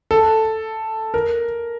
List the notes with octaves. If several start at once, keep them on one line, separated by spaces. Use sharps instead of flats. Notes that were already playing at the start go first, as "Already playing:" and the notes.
A4
A#4